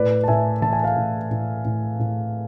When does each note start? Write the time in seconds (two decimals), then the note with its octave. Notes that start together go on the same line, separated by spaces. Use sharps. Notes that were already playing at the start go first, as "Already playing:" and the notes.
Already playing: A2 B4 D5
0.24 A5
0.28 A2 E5 G#5
0.62 E3 A5
0.73 G#5
0.84 F5 A5
0.96 A2
1.31 A2
1.65 A2
1.99 A2